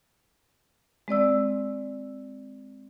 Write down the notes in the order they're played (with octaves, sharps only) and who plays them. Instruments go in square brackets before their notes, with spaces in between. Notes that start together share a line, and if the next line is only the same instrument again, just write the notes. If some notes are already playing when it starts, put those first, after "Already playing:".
[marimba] G#3 C4 D5 E6